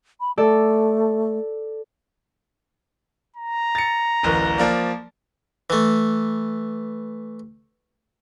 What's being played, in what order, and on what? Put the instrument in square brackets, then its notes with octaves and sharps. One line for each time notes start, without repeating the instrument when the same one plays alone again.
[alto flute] B5
[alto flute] A3 [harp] A4 D5
[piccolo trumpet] A#5
[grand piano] A6 C#7
D1 A1 A#4
F3 A#3 D5
[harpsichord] E3 A3